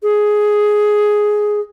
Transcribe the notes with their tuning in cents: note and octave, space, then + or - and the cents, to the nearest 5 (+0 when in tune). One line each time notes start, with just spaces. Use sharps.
G#4 +5